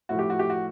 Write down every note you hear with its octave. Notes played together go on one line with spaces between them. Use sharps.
A2 F3 F#4
G4
F#4
G4
F#4